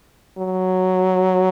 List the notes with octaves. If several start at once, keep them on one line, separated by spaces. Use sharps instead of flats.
F#3